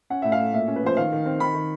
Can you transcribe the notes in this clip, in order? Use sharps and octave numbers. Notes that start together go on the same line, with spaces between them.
C#4 F#5
A2 E5
F5
A3
A#2 E5
C#4
B4
F3 C5
D#3 F5
D#3
C4
D#3 B5
D#3